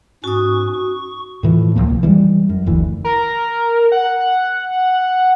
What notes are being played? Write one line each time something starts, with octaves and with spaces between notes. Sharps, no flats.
G#2 C#4 F#4 C#6 D#6
C#6
A2 E3 F3
C#2 F#2 F3 A#3
C2
E3 G3 G#3
F#2
F#1 D2 E3
A#4
F#5